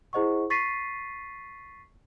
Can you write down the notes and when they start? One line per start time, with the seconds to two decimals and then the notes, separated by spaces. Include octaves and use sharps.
0.13 E4 G#4 C5 D#5 F#5 C#6
0.50 C#6 A6 B6 C7 D#7